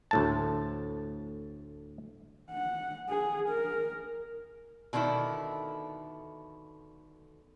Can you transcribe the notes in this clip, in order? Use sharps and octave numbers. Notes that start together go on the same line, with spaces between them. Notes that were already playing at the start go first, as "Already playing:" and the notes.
D2 A2 A5
F#5
G#4
A#4
B2 D3 D#3 A3 E4